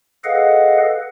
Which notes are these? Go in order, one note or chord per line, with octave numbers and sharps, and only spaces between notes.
G#4 A4 B4 D#5 F5 F#5